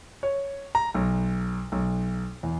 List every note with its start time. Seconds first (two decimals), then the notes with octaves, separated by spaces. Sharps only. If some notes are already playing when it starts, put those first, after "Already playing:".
0.23 C#5
0.75 A#5
0.95 B1
1.72 B1
2.43 E2